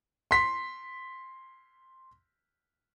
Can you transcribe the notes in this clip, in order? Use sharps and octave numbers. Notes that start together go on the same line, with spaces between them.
C6 B6